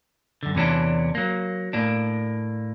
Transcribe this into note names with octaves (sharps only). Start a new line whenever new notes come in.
F#2 D3
E2 C3 E3 B3 C#4 D4
F#3 A#3
A2 A#3 D4